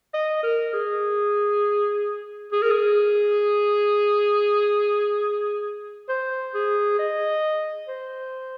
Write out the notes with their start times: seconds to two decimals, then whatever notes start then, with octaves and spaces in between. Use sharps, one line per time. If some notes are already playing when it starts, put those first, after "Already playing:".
0.14 D#5
0.43 A#4
0.73 G#4
2.52 G#4
2.62 A#4
2.71 G#4
6.09 C5
6.54 G#4
6.99 D#5
7.88 C5